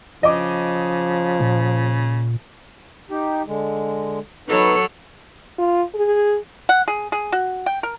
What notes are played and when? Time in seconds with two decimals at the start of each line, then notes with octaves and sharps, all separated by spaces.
0.23 C#3 F3 D#5 D6
1.40 A#2
3.11 D#4 G4
3.47 D3 G#3
4.49 F#3 B3 D#4 A4 B4 C#5
5.58 F4
5.95 G#4
6.69 F#5
6.88 G#4
7.12 G#4
7.32 F#4
7.66 G5
7.83 A#4